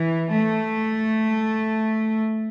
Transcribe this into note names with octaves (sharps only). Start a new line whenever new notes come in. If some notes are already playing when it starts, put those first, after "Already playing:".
Already playing: E3
A3